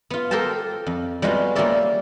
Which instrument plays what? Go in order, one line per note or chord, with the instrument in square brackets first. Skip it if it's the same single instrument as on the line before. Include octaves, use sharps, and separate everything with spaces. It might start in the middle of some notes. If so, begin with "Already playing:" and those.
[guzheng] B3 F4
G4 A4 A#4 C5 G5 A5
F2
G3 G#3 B3 F4 F#4
G3 A#3 F4 C#5 D5 E5